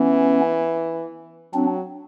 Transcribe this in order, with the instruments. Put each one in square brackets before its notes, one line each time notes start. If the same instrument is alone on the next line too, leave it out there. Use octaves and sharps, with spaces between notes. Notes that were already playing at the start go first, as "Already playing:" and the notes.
Already playing: [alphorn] E3 [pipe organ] B3 C#4
[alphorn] F#3 [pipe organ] C4 D4